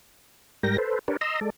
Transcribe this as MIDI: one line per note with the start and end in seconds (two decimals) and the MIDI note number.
0.63 0.77 44
0.63 0.77 55
0.63 0.77 70
0.63 0.77 79
0.63 0.77 94
0.78 0.99 69
0.78 0.99 71
0.78 0.99 72
1.08 1.17 62
1.08 1.17 67
1.08 1.17 70
1.08 1.17 71
1.08 1.17 73
1.08 1.17 74
1.21 1.40 75
1.21 1.40 82
1.21 1.40 84
1.21 1.40 87
1.21 1.40 88
1.41 1.50 56
1.41 1.50 69
1.41 1.50 74